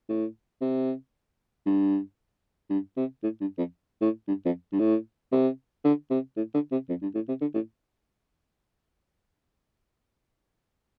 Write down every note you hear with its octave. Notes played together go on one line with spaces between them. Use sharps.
A2
C3
G2
G2
C3
A2
G2
F2
A2
G2
F2
G2
A2
C3
D3
C3
A2
D3
C3
F2
G2
A2
C3
D3
A2